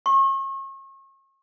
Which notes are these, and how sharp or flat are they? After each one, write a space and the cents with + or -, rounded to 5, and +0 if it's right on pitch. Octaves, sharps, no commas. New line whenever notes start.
C#6 -40